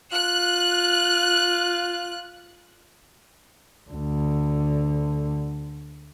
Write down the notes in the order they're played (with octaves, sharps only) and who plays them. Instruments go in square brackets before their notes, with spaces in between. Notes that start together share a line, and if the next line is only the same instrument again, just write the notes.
[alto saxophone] F4 [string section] F#6
[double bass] D2 D3